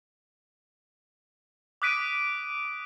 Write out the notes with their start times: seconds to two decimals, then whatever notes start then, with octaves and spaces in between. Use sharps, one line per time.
1.82 D6 D#6 F#6 B6 D7 D#7